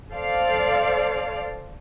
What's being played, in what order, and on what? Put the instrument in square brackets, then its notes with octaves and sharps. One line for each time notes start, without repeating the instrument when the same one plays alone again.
[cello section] A4 C5 D5 F5